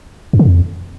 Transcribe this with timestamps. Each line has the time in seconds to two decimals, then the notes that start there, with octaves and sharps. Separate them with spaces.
0.33 F#2
0.39 C#3
0.45 F2